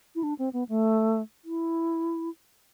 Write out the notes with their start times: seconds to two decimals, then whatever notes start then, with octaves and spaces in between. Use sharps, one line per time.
0.15 E4
0.23 D4
0.39 C4
0.53 B3
0.69 A3
1.45 E4